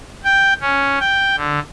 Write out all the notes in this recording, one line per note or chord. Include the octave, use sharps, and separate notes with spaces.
G5
C#4
G5
D3